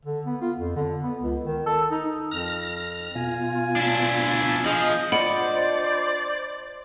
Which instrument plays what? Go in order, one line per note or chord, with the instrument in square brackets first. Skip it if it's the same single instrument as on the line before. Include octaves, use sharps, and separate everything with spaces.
[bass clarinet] D3
B3
F4
F2
D3
B3
C#2
D#3
A4
D#4
[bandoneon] F2 [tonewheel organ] F6 A#6
[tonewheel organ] B2 F4 [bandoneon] G#5
[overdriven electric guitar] D4 E4
[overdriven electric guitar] F3 [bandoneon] G#4 D#5
[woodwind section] D4 F4 C5 [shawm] D5 [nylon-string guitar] D#5 [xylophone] F#5 B5 D7